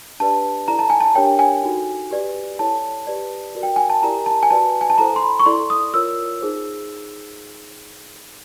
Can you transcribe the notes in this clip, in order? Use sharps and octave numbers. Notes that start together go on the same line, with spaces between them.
D4 G4 B4 D5 A5
E4 A4 D5 A#5
A5
G#5
A5
D4 G4 A#4 C#5 G5
G#5
D#4 F#4 A4
G4 B4 D5
E4 A4 C#5 A5
G4 B4 D5
F#4 A#4 D5
G5
G#5
A5
E4 G4 A#4 D5 A#5
A5
G#5
F#4 B4 D5 A5
G#5
A5
E4 A4 C5 A#5
C6
B5
C#6
E4 A4 D5 C6
D#6
F4 A#4 C#5 E6
D#4 G#4 C5